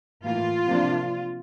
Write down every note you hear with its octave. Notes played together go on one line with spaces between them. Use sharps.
A2 E3 A#3 F4
C3 F3 A#3 D4